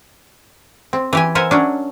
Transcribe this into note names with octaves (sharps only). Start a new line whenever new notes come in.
C4
E3 G4 G#5
A#4 C5 E5 F#5 G#5
F#3 C#4 D4